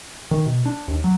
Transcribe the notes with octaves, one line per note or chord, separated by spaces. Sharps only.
D#3
B2
D4
D#2
F#3